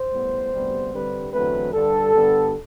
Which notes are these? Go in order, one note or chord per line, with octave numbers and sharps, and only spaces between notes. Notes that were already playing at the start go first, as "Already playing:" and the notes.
Already playing: C5
A2 G3 B3
D2 C3 G3 B3
G2 D3 G3 C4 B4
E2 D3 F#3 A3 C4 B4
G2 D3 G3 A4
G2 D3 G3 B3